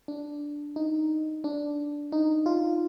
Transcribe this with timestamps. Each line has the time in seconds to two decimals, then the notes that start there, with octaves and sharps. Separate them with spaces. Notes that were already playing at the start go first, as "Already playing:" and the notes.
0.08 D4
0.76 D#4
1.44 D4
2.12 D#4
2.46 F4